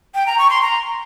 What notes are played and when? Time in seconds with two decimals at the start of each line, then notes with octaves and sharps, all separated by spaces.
0.15 G5
0.27 A#5
0.38 C#6
0.50 C6
0.62 A#5